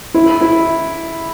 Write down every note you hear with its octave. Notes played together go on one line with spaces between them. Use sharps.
E4
E4